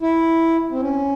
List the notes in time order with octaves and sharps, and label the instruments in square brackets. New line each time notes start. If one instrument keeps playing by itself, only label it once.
[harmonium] E4
C4
C#4